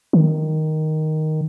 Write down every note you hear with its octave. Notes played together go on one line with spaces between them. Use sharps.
D#3